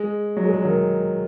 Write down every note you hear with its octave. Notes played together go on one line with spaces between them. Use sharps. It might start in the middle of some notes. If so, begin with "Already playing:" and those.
Already playing: G#3
F#3
G#3
F#3
D#3